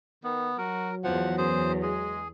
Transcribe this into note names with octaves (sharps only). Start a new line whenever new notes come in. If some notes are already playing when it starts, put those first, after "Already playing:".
D#3 B3
F#3 F#4 A#4
E2 F3 F#5
F#2 G#4 C5
G#3 G#4